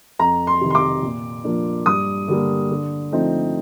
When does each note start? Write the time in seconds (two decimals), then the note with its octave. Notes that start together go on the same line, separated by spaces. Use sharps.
0.19 F2 A#5
0.47 C6
0.61 C3 D#3
0.70 C6
0.75 D6
1.02 A#2
1.44 F3 A#3 D4
1.86 G2 D#6
2.28 D3 G3 A#3
2.70 D3
3.12 F3 A3 C4 D#4